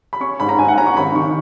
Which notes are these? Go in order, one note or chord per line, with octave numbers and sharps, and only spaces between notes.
B5
C#4 C#6
G#2 B5
A#5
G#2 G#5
F#5
C#4 A#5
C#6
G#1 B5
D#3 C#6